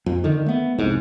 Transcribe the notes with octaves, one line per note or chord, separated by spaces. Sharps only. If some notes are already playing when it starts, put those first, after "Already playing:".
F2
D3 D#3
A3 B3
C2 F2 G#2